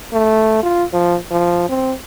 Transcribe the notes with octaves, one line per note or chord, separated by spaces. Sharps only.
A3
F4
F3
F3
C4